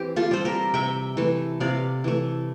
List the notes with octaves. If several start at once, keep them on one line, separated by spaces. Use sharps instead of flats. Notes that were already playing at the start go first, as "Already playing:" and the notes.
Already playing: E3 C4 G4 C5
F4 A4
G3 C4 C5
G4 A#4
C3 E5 G5
E3 A3
C3 D5 F5
E3 A3